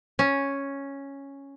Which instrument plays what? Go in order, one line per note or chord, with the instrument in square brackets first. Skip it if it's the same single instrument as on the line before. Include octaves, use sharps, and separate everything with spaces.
[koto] C#4